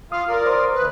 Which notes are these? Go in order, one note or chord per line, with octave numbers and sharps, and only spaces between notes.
F4 F5 D#6
A#4 D5
C5 C6 D#6
D2 B4